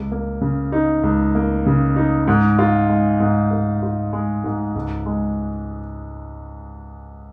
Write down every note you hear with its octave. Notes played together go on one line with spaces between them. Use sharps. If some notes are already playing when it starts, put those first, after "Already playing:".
Already playing: C#2
A#3
C#3
D#4
C#2
A#3
C#3
D#4
G#2
F4
G#3
G#2
G#2
F4
G#3
G#2
C#2
G#3